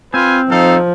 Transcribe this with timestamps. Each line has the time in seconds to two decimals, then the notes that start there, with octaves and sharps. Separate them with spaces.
0.14 C4 F4 B4 G#5
0.50 F3 D#4 A4 F5